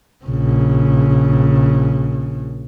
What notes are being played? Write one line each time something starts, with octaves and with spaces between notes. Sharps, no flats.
A#1 C#3